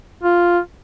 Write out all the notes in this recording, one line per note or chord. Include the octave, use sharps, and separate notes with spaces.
F4